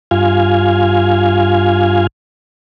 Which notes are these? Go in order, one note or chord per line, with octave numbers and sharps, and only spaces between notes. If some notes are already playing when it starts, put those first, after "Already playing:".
G2 F4 F5 G#5